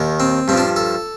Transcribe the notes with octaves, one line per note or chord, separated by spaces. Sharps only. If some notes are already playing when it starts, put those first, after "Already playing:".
Already playing: D#2 D#3
C4
G2 F3 C4
D4
A4